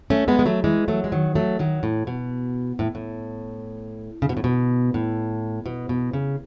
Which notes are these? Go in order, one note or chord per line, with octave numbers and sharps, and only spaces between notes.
A3 C#4
G#3 B3
G#3
F#3 A3
E3 G#3
F#3 A3
G#3
D#3 F#3
F#3 A3
D#3 F#3
A2
B2
A2
A2
C#3
B2
A2
B2
A2
B2
B2
C#3